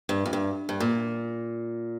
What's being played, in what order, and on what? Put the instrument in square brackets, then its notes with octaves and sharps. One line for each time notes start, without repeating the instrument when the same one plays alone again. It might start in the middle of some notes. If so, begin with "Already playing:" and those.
[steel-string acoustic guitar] G2
F2
G2
G2
A#2